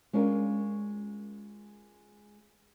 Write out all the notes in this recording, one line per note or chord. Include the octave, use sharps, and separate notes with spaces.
G#3 C#4 D4 F4 A#4